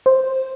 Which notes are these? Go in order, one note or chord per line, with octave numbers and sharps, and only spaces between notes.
C5